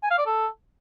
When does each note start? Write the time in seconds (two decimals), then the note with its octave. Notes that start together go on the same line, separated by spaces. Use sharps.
0.03 G#5
0.11 F5
0.18 D5
0.26 A4